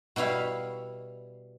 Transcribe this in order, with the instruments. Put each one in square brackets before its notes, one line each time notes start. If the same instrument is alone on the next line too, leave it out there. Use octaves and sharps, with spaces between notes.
[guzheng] B2 G3 E4 F5 B5